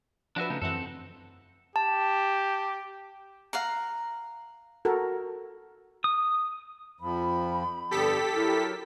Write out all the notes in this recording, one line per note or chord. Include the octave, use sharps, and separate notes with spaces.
F3 D4 F#4 B4 E5
C#3 A3 D#4
F#2 E3 C4 A4 F#5
G4 A5
F5 F#5 A#5
F#4 A4 A#4
D#6
F2 F3 B5
G2 D3 B3 G4 A4 B6
F#3 E4 A#4